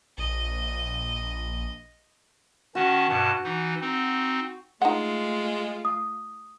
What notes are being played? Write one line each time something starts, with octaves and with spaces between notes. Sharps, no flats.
A#1 D#5
D#3 C#4 F#4 A5
G2 B2 A5
E3 D#4
C4 D#4
G#3 A3 D#4 F4 F#5
D#6